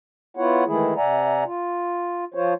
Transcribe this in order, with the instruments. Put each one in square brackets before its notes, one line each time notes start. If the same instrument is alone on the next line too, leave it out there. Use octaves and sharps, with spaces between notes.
[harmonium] B3 E4 F4 C#5 F#5
D#3 E3 G#3 A3 E4 G#4
C3 D5 E5 F#5 G#5 A#5
F4
F3 F4 C5 C#5